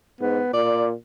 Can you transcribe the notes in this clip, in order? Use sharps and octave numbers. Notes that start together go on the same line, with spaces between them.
G#2 B3
A#2 D5